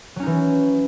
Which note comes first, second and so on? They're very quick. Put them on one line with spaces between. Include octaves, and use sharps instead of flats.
F#3 C#4 D#4 E3